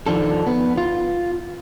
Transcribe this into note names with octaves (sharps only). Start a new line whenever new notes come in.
D#3 F3 D4 A4
B3
F4